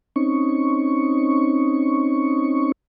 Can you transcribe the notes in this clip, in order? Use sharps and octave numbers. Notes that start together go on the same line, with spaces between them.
C4 C#4 D#4 C#6